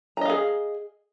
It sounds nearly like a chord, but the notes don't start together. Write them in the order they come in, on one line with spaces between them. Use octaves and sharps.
A#5 D#5 F5 G#4